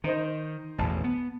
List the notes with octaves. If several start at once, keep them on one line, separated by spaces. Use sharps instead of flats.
D#3 D#4 C5 D#5
A1 E2 B2 A5
B3